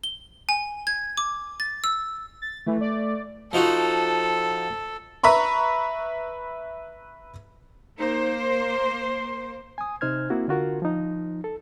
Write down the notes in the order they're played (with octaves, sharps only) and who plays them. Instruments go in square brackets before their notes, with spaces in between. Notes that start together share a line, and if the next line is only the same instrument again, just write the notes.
[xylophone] G7
G#5
G#6
D6
A6
E6
[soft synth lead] A6
[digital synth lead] E3 [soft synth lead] A3
[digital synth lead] D5
[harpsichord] F3 D#4 F#4 [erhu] A4
[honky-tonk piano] B4 E5 A#5 B5 C#6
[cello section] A#3 C5 [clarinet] D#4
[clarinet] C6
[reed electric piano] G#5 D#6
C3 D#4 C5 F6 G#6
A#3 C4 E4 F#4
D3 F4 F#4 A#4
F3 D#4
A4